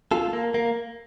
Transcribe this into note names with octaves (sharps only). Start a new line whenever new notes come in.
F4 A4
A#3
A#3